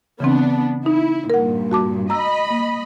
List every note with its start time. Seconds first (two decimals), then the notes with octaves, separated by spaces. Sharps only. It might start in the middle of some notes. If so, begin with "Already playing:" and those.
0.20 C#3 E3 B3 C4 D4
0.86 D#4 E4
1.30 G2 A#2 A#4 F#5
1.71 F#4 A5 D6
2.10 D#5 A#5 B5 E6
2.51 A#3